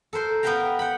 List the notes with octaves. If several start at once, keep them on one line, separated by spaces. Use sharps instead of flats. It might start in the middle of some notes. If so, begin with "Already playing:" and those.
A4 A#4 C5 C6
B3 A#4 B4 F5 G5 A#5
F#5 G5 B5